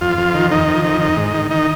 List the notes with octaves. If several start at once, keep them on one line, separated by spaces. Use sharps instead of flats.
F2 F4
F2
D#3
D#3 D#4
F2
D#3
D#3
G#2
D#3
D#3 D#4